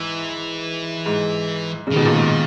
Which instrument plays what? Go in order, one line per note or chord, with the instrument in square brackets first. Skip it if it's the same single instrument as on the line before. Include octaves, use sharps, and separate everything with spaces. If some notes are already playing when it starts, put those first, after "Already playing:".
Already playing: [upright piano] G#2 [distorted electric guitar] E3
[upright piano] G#2
C#3
[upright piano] B2 [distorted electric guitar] D#3
[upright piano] A#2
G#2